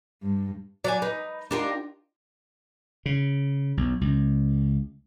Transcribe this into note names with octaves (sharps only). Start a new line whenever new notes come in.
G2
F#3 D5 F5 G#5
D#4 B4
D4 D#4 F4 G4 A#4 G5
C#3
B1
C#2